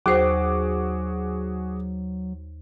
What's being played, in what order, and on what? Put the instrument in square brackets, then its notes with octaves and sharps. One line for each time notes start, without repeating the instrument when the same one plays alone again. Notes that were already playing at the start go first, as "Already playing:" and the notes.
[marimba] D#2 C5 [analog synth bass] F#3 [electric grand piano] F#4 G#4 D6